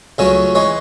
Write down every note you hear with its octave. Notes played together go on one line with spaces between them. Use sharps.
C#2 C#3 F#3 A3 C#4
E3 G#3 C#5